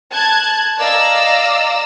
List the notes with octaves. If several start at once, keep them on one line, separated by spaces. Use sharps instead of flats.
A5 F#6 G#6
D5 D#5 F5 A#5 E6